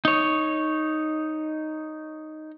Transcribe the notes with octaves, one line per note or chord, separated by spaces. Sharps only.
D#4 C#5